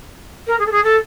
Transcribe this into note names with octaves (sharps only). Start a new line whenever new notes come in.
A#4
G#4
A4
G#4
A4